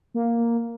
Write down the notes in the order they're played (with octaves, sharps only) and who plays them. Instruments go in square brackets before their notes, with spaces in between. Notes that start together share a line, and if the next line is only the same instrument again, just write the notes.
[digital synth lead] A#3